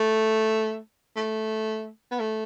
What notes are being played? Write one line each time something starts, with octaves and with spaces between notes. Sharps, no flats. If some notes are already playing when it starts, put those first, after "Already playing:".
Already playing: A3
A3
B3
A3